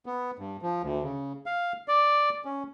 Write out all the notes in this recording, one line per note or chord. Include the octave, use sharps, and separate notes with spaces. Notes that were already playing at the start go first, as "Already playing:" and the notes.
B3
G2
F3
D2
C#3
F5
D5
C#4